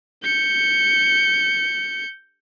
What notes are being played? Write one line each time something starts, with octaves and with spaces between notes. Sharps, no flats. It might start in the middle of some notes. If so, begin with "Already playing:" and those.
G6 C#7